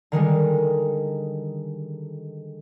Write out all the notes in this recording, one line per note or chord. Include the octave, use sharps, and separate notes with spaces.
D3 D#3 G3 G#3